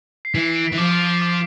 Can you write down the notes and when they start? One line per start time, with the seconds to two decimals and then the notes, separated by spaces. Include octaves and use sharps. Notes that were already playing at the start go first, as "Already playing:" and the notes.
0.25 C7
0.34 E3 B6
0.45 C7
0.56 D7
0.67 B6
0.72 E3
0.78 F3 D6
1.22 D6